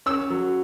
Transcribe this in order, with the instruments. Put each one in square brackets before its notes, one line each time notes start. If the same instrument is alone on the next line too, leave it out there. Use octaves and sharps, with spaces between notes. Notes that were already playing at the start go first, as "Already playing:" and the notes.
[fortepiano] C#4 E6
F#3